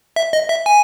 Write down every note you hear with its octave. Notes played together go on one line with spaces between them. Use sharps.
E5
D#5
E5
G#5